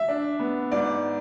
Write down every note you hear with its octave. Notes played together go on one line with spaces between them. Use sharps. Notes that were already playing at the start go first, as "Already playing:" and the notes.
Already playing: E5
D4
B3
G#2 D5